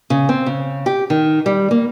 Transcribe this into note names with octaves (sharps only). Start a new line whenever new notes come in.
C#3
C4
C#3
G4
D#3
G3
A#3